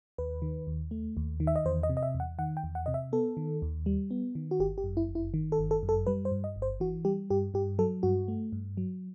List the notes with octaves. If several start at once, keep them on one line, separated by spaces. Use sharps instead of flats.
D#2 B4
D#3
D#2
A3
D#2
D#3
E5
D#5
E2 C5
D#5
C3
D#5
E5
E2
F#5
D#3 F#5
G5
E2
F#5
C3 D#5
E5
B3 A4
D#3
D#2
G3
B3
D#3
F#4
G1 G4
G4
F#2
E4
G1
E4
D#3
A4
G1
A4
F#2
A4
G3 B4
C5
G2
D#5
G1
C5
E3 F#4
G3 G4
G2 G4
G2 G4
F#3 A4
G2 F#4
A3
G2
F#3